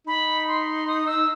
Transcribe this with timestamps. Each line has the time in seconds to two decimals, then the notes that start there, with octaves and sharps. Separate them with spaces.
0.07 D#4 B5
0.48 C6
0.88 D#6
1.07 E6